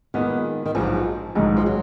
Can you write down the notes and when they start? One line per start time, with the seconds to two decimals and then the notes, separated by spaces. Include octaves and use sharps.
0.14 A#2 D#3 G#3 B3
0.66 D#3
0.75 A#1 G#2 F3 F#3
1.35 A#1 G#2 D#3 F#3 G#3
1.57 F3
1.66 F#3